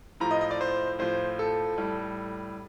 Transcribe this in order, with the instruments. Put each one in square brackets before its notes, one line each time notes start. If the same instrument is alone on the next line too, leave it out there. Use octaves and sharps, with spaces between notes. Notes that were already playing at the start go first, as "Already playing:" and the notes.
[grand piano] A2 F3 A#5
D#5
D#5
D5
C5
A2 F3 C5
A4
A2 G3